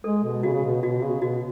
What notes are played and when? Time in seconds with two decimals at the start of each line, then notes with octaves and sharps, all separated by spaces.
0.04 G#3 A4
0.24 B2
0.43 C#3 F#4
0.54 C#3
0.64 B2
0.82 B2 F#4
1.02 C#3
1.21 B2 F#4